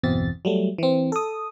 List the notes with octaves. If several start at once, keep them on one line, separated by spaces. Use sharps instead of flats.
G1 E2 B2 C4 A6
F#3 G3 A3
E3 C4
A4 D#6